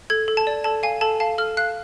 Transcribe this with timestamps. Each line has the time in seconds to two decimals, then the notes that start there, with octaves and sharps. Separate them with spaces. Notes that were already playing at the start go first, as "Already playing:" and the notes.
0.10 A4 G#6
0.28 A4
0.37 A5
0.47 D5
0.64 A4 A5
0.83 F5 G#5
1.01 A4 A5
1.20 F5 A5
1.38 A4 F6
1.57 F5 F#6